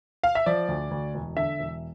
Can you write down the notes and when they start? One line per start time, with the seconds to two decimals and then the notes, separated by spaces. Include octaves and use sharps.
0.23 F5
0.35 E5
0.46 F3 D5
0.68 D2
0.91 D2
1.15 E1
1.36 D3 E5
1.60 E1